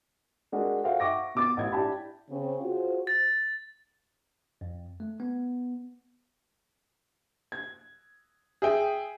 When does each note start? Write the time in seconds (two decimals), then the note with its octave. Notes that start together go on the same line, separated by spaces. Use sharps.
0.52 G#3 D4 F#4 G#4 A#4
0.84 F#4 A4 C5 E5 F5 G5
1.00 E5 F#5 C#6 D6 A#6
1.35 B2 D6 A6
1.57 A1 E4 G#6
1.72 D4 E4 G4 A5 B5
2.29 C#3 C4 C#4
2.61 F4 F#4 G#4 C5
3.07 A6
4.61 F2
5.00 A3
5.20 B3
7.52 G#6
8.62 G#4 E5 G5